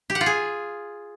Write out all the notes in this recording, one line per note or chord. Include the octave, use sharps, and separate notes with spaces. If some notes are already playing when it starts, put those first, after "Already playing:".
G4
F#5
F4
G#4